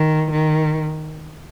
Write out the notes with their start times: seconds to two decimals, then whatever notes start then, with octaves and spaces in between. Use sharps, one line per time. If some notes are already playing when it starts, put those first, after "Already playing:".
Already playing: D#3
0.31 D#3